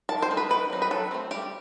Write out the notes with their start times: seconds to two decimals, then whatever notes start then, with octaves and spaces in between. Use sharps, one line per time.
0.09 D#3 A5
0.22 C5
0.30 A3 D#4
0.37 B4
0.50 D#3 B4
0.70 F#3 C4 D#4
0.82 B4
0.91 F#3 A4
1.11 A3 C4
1.31 G3 G4